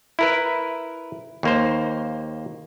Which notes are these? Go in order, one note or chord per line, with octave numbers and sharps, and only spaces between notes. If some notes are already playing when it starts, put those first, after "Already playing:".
E4 A#4 B4
D#2 A#3 C5